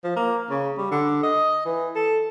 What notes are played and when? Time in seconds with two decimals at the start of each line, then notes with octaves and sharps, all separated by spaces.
0.04 F3
0.16 A#3
0.50 C#3
0.78 G3
0.91 D3
1.23 D#5
1.65 E3
1.96 A4